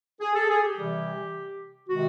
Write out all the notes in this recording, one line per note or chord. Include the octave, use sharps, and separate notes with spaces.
G#4
A4
G#4
G4
C3 E3 G3
C3 D#3 G#3 F#4